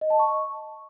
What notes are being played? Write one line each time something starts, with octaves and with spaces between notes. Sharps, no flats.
D#5
A5
C#6